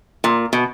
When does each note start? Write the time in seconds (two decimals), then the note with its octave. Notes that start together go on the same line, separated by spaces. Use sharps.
0.24 A#2
0.53 B2